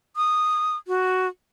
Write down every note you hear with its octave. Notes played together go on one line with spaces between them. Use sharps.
D#6
F#4